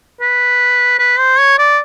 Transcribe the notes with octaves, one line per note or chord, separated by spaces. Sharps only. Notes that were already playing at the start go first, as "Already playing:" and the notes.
B4
B4
C5
C#5
D5